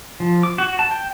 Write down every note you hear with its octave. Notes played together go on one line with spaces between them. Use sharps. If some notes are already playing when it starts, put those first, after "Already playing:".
F3
D6
F#4
A5
G5